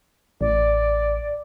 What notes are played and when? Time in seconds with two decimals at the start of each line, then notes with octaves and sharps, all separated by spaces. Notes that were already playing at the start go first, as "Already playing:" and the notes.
0.41 A1 D5